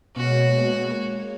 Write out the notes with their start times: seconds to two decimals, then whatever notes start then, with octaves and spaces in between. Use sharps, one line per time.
0.16 B2 G#3 A#3 C#4 F#4 C#5